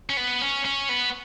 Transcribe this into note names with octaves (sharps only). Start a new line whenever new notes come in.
C#4
B3
C#4
C#4
B3